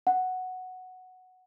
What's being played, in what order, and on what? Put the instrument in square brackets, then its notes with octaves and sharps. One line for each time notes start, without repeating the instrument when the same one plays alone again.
[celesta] F#5